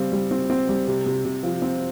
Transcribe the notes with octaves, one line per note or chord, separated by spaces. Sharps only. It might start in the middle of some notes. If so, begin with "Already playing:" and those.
Already playing: C#3 G3 C4
G3
C4
C4
G3
C3
C3
C3
F3
C4